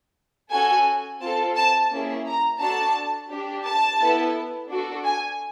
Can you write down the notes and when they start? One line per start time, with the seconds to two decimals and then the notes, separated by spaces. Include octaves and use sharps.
0.51 C#4 F#4 A4 G#5
1.21 C4 F4 A4 A5
1.56 A5
1.90 A#3 C#4 E4 G#4
2.26 A#5
2.60 D4 F#4 A4 A5
3.31 D4 G4
3.65 A5
3.99 B3 E4 A4
4.69 D4 F#4 A4
5.05 G#5